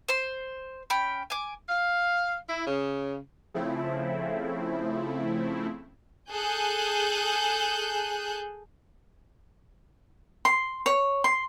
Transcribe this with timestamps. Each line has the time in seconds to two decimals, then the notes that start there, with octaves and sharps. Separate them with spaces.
0.08 C5 C6
0.90 C#4 G5 B5
1.30 G#5 D6
1.69 F5
2.48 E4
2.67 C#3
3.54 C#3 F3 A3 C4 E4
6.31 G#4 A4 G#5 F#6 G6
10.45 C6
10.86 C#5
11.24 C6